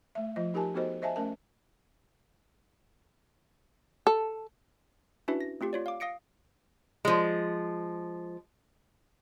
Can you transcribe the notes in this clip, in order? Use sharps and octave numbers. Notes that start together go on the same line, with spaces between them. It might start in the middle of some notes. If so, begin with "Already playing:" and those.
A3 E5
F3 F4 D#5
D#4 G4 A#4 G#5 A5
B3 D#4 F#4 A4 C5 D#5
C5 D#5 E5 G#5 A5
A3 C#4 A#4 A5
A4
C#4 D4 E4 F#4 B4 E5
A#6
A3 C4 F4 G4
F4 C#5 D5
F5 D6
F5 D#6 A#6 C#7 D7
F3 G#3